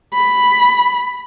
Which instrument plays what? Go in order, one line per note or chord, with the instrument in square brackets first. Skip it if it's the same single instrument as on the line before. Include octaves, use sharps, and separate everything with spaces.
[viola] B5